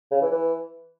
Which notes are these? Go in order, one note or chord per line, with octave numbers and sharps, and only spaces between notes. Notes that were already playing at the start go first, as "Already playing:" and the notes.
C#3
E3
E3